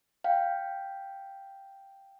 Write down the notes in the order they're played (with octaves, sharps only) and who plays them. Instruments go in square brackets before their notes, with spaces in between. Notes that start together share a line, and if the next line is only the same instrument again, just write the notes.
[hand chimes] F5 G5